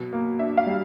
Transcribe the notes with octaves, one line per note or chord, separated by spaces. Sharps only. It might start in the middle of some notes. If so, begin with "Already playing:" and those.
Already playing: B2 F#3
A#3
D4 E5
F5
G3